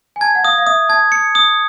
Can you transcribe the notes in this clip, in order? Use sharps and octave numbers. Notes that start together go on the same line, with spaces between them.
G#5
A5 G#6
F#5
F5 D#6
F5
E5 D#6
A5 G#6
C#7
D#6